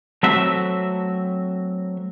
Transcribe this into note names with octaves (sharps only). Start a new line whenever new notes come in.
F#3 A3 C4 F#4 E5